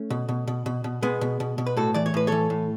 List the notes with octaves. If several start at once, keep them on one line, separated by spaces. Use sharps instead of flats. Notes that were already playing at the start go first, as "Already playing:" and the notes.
Already playing: A3 C#4
B2
B2
B2
B2
B2
B2 G#3 B3
B2
B2
B2
B4
A2 F#4 A4
E3 D5
C#5
A2 B4
E3 A4 C#5
A2